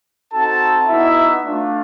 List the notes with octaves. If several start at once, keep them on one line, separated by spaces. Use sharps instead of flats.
C4 D#4 F#4 A4 A5
B3 D#4 E4 F#4 E5
A3 D4 F4